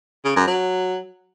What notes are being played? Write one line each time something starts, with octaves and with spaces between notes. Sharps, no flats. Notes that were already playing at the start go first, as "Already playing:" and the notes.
C#3
F#2
F#3